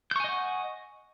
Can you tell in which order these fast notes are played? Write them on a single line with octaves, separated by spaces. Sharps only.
G6 C#6 G#5 D#5 F#5